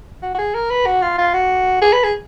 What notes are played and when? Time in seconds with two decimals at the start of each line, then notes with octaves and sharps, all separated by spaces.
0.23 F#4
0.34 F#4
0.38 G#4
0.54 A#4
0.70 B4
0.86 F#4
1.02 F4
1.18 F4
1.34 F#4
1.82 G#4
1.93 B4
2.04 G#4